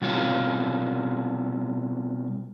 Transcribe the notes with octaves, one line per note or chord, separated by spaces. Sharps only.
B2 G3 C4 F4 C#5 F5